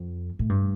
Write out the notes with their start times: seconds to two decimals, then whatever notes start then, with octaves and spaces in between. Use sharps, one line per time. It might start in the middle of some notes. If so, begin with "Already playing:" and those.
Already playing: F2
0.39 A2
0.49 G2